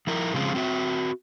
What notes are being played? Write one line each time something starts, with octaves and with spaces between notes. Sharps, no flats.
F3 E4 A#4
C#3 F3 G#3 C4 F4
C4 F#4 E5